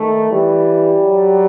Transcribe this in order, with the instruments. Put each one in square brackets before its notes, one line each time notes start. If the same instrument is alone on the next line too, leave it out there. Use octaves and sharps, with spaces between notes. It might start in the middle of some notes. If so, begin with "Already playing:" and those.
Already playing: [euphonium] D#3 [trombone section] A3
[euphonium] E3 [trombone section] G3
[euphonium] F#3